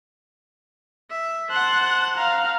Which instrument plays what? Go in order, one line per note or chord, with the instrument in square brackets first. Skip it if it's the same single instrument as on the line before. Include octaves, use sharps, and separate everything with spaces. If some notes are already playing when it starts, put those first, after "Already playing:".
[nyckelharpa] E5
[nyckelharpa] C5 F#5 [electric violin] A5 F#6
[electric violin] F5 A#5